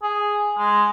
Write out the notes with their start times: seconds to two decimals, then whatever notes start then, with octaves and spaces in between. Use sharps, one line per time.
0.03 G#4
0.58 G#3